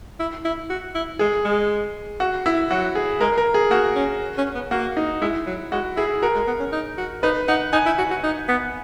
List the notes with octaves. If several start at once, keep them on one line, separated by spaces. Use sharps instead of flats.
E4
E4
F#4
E4
G#3 G#4
G#3
F#4
E4
F#3 F#4
G#4
G#3 A#4
A#4
G#4
A#3 F#4
C#4
C#4
B3
A#3 F#4
D#4
G#3 E4
F#3
G#3 F#4
E4 G#4
F#4 A#4
G#3
B3
C#4
D#4
F#4
D#4 B4
D#4 F#5
D#4 G#5
E4
F#4
F#4
D#4
B3